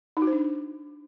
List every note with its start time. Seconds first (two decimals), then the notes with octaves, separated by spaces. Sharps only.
0.17 D#4
0.22 F#4
0.27 C5
0.33 D4